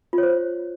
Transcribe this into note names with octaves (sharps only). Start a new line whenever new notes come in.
F4
C#5
C5